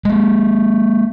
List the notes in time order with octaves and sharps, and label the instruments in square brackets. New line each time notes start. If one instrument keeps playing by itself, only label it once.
[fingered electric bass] G#3 A#3